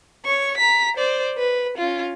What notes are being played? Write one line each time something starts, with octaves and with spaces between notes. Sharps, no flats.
C#5 C#6
A#5 B6
C5 D5
B4
C#4 F4